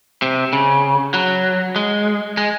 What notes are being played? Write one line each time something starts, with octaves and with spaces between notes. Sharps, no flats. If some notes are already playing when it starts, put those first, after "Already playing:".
C3
C#3
F#3
G#3
G#3